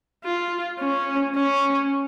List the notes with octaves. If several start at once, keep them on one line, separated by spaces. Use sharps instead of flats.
F4
C#4
C#4